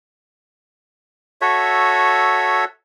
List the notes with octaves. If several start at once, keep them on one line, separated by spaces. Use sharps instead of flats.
F#4 A4 C#5 E5